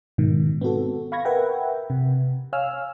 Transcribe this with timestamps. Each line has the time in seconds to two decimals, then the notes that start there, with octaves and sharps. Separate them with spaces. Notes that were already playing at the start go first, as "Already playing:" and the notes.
0.18 G#2 B2 D#3
0.61 B3 C4 F#4 A4
1.12 F5 B5 C#6 G#6 A#6
1.25 A#4 B4 E5 F#5 G5
1.90 C3
2.53 C#5 F5 G#5 E6 F6